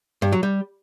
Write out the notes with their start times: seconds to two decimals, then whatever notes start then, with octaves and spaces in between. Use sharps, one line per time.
0.22 G2
0.32 F#3
0.43 G3